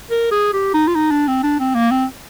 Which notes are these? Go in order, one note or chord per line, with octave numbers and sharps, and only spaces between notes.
A#4
G#4
G4
D#4
F4
D#4
D4
C4
D4
C4
A#3
C4